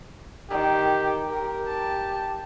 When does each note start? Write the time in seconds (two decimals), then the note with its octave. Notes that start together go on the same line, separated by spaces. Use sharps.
0.51 D#3 G4
1.30 G4 A#4
1.67 A5